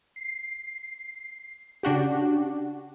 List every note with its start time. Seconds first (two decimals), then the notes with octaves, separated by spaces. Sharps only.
0.16 C7
1.83 C#3 D4 F#4 G4